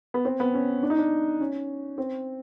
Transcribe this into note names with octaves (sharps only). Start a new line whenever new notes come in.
B3
C4
B3
C#4
D4
D#4
D4
C#4
C4